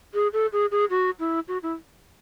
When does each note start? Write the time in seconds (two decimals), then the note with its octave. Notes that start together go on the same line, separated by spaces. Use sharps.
0.14 G#4
0.33 A4
0.53 G#4
0.71 G#4
0.90 F#4
1.20 E4
1.48 F#4
1.63 E4